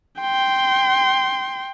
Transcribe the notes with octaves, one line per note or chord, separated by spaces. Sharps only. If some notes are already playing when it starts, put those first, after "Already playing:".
G5 C6